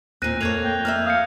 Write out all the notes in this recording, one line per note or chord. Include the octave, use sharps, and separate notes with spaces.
D#2 A#2 C4 F#6 A#6 D#7
F2 A#3 A4 C#5 G#6 D#7 F7
G5
A#3 D5 E5 F6
F5 D#6 G6 C#7